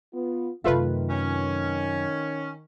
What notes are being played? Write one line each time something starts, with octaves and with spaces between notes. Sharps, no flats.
B3 F4
F#2 C3 D#3 A3 F4 B4
C#4